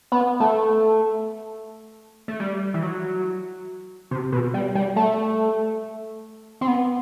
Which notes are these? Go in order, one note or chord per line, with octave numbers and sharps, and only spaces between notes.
B3
A3
A3
G3
E3
F#3
C3
B2
G3
G3
A3
C4
B3